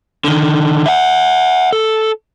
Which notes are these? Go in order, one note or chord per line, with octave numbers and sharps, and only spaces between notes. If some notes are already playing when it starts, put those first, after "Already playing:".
D3 D#3
E5 F#5
A4